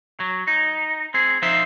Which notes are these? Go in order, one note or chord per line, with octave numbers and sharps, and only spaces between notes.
F#3
D#4
C4 G#4
F3 D#4 C5 E5